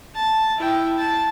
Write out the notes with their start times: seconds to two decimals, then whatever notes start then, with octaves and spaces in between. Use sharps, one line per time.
0.15 A5
0.58 E4 G5
0.98 A5